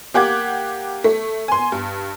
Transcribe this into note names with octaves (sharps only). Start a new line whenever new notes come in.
A#3 G4 F#5 D6 G#6
A3
G#5 C6
G2